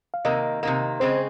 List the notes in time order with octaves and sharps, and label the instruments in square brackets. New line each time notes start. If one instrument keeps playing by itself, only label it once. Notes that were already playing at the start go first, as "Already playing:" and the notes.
[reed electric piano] F5
[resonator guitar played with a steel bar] C3 D#3 A#3 [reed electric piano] D#5
[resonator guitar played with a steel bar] C3 D#3 A#3
[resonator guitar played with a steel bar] C#3 G#3 C4 [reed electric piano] C5